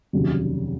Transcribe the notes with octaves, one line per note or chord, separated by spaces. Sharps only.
F1 D#2 C#3 F#3